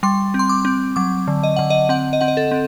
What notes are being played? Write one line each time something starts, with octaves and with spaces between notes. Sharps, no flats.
G3 C6
C4
C6
D6
C4
F#3 D6
D3
D#5
D3 F#5
D#5
C4 F#5
D#5
C4 F#5
D#5
A4
C4